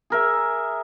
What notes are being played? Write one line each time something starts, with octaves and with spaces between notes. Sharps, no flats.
G#4 A#4 E5